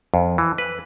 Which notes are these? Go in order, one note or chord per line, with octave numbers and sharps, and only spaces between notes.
F2
E3
B4